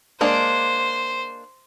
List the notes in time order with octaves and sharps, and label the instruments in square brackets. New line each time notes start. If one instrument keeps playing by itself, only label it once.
[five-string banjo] G#3 A#3 D4 [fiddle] C5